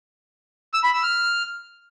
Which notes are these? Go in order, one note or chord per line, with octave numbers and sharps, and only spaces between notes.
E6
B5
E6
F6